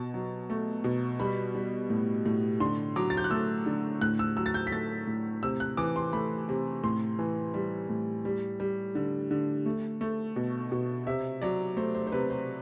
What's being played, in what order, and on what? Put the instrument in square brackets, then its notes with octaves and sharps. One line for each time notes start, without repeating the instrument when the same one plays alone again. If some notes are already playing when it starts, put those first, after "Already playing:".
Already playing: [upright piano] B2 A5
F#3
A3
B2
G3 B5
G3
A2
A2
D3 C6
F#3 D6
A6
G6
F#6
A3 E6
D3
A2 F#6
E6
F#3 E6
A6
G6
B6
A3 A6
A2
C3 E6
F#6
E3 D6
C6
A3 B5
C3
A2 C6
E3
G3
A2
G3
G3
D3
D3
A3
A3
B2
B2
C3 E5
F#3 D5
A3 C5
C5
C5
C3 B4
C5